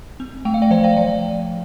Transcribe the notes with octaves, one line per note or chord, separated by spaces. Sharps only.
C4
A3 G5
F5
D5 G5
F3 C5 F5
D5 G5
F3 D5 G5